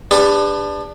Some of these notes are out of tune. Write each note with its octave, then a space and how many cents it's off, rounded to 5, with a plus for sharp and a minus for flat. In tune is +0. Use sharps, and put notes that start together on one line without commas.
D4 +0 G4 +45 B4 +20